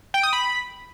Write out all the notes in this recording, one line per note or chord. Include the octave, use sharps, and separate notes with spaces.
G5
D#6
B5